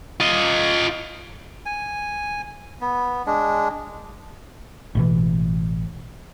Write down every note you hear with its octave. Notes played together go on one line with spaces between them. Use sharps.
F4 D#5
G#5
B3
G#3 D4
A1 B2 E3